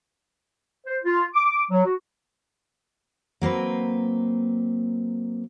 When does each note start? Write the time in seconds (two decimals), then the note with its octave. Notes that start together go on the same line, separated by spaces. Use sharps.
0.87 C5
1.04 F4
1.34 D6
1.47 D6
1.71 F#3
1.85 F#4
3.42 F#3 A#3 C4 B4